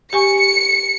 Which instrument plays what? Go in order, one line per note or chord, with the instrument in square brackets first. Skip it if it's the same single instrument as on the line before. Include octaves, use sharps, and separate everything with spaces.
[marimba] G4 G#5 C#6 [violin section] C#7